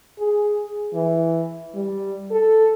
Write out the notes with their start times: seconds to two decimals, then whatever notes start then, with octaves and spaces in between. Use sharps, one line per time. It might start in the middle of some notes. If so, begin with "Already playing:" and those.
0.19 G#4
0.94 E3
1.75 G3
2.31 A4